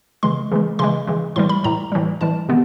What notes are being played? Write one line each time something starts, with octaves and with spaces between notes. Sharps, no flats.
C#3 E3 G#3 C6
C#3 E3 G#3
C#3 E3 G#3 C6
C#3 E3 G#3
A2 E3 G3 C6
B5
A2 E3 G3 A#5
A2 E3 G3
A2 E3 G3 A5
C3 D#3 G#3 B3